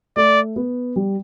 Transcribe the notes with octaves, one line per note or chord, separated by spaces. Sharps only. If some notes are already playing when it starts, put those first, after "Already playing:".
A3 D5
B3
G3